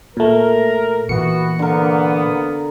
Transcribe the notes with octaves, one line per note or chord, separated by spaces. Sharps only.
A#2 A3 A#4
A#2 E3 B3 F#4 C#7
D3 A#3 B3 A#4